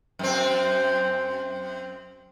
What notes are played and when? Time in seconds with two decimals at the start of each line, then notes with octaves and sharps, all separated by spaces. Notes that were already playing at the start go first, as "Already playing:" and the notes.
0.19 F#2 C4